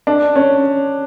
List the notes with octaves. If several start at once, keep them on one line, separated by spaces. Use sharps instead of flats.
D4
C#4